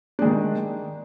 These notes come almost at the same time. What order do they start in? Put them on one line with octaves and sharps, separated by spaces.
D4 G#3 D#3